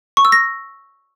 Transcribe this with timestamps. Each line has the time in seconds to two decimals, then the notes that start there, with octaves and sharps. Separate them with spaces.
0.17 C#6
0.25 E6
0.32 A#6